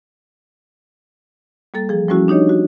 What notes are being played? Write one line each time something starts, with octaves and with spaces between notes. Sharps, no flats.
G3 A#3 A4 A6
E3 F3 G#4
F3 G3 A3 C#4 E4 F#4
D4 D#4 G4 C#5 D#5
F#4